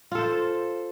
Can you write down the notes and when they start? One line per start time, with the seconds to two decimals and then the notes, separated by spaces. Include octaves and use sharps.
0.12 F4
0.15 A4
0.19 C5